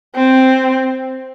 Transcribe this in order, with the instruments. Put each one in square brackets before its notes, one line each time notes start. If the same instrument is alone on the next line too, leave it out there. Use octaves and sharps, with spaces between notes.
[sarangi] C4